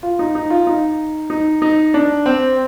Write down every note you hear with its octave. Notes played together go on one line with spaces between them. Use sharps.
F4
D#4
D#4
F4
D#4
D#4
D#4
D4
C4